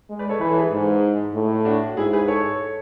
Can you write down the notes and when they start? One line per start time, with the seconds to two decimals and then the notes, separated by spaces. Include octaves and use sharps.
0.09 G#3
0.19 B4 D5
0.29 A4 C#5
0.40 E3 B4
0.48 A4
0.58 G#4 B4
0.72 G#2
1.34 A2
1.65 D4 F#4
1.97 G#2 E4 G#4
2.13 G#4 B4
2.28 A4 C#5